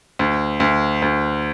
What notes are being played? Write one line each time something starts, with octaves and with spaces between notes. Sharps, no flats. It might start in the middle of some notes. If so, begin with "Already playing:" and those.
D2
D2
D2